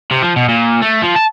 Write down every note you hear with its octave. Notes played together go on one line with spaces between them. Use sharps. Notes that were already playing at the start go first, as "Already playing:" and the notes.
C3
F3
B2
A#2
A3
F3
A5